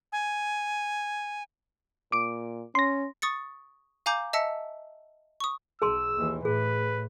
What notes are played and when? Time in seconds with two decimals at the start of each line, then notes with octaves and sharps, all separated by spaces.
0.12 G#5
2.12 A#2 D6 D7
2.75 C#4 C6 A#6
3.22 C#6 D#6 A6 C#7
4.06 F5 G#5 A#5 D6 G6
4.33 D#5 E5 A5 E6 B6 C#7
5.40 C#6 D#6
5.82 B1 G#4 A5 C6 E6
6.17 D#2 E3
6.45 A2 G#4 B4